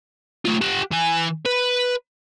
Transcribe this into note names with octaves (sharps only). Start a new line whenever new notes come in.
A3 F4
G4 F#5
E3 G#5
B4